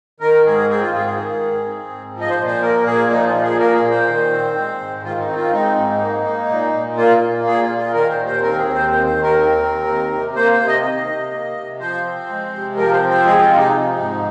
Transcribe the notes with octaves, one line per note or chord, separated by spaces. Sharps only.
D#3 A#4
G#2 G#4
C4 G#4
F4
G#2 F4
G#4
D#3
G#2
C4
G#2
F3
D#5
C5
A#2
C5
A#3 A#4
A#2 G#4
F3 D#4
F4
A#2
G#4
A#3 A#4
G#4
A#2
C5
D#3
C4
G#3
G#2
D#3 F4
D#4
C4
F4
G#3 D#4
G#2
A#3
A#3
A#2
A#2
A#3 F4
A#3
A#2 G#4
F4
A#2
F4
D#3 A#4
C5
D#2
C5
C4 A#4
G#4
D#2
C5
D#3 C5
C5
D#2
A#4
C4
D#2
D#3
C3
A#3 C5
C5
C3
D#5
D#3
C3
A#3
C3
F3 C5
C4
G#3
C3
F3 A#4
C5
C4
C5
G#3 G#4
F4
C3
D#4
F3
G#2